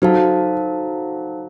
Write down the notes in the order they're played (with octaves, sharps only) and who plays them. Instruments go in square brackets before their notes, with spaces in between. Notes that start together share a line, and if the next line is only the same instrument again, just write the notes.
[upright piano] F#3 [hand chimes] D#4 A4 C5 F5 A5